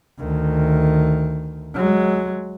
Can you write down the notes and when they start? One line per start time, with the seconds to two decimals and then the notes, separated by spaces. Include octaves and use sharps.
0.19 D2 D#3
1.74 F#3 G#3